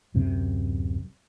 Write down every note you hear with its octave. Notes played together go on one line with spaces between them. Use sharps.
D1 F#2 C3